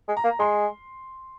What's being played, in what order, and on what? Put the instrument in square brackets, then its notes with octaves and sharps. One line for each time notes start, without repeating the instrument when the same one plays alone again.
[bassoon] G#3
[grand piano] A#5
[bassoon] A#3
[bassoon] G#3 [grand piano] C6